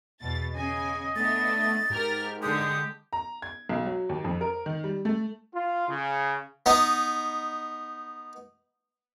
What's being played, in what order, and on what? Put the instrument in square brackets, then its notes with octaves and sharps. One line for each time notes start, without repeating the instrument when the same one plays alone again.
[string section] E2 B2 A6
[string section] C#3 G#5 [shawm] D#5
[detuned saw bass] A3 [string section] B3 D4 [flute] A6
[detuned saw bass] G#2 [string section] G4 A#4 F6
[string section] D3 G#3 [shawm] G4 [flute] D#6
[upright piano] A#5
G#6
B1
F#3
D#2
F2
A#4
D#3
G3
A3
[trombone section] F4
C#3
[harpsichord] B3 D#4